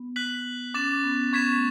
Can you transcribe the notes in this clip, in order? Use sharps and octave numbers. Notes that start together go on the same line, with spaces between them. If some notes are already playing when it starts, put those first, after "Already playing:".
Already playing: B3
F#6 B6 F#7
C#4 D6 A6 E7
B3
B3 C#6 G#6 B6 E7
A3